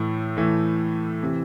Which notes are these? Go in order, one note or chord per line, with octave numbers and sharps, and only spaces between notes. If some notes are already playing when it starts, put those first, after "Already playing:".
Already playing: A2 E3 A3
A2 E3 A3
C3 E3